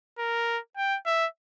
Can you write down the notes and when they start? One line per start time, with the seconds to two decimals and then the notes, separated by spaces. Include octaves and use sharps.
0.18 A#4
0.77 G5
1.06 E5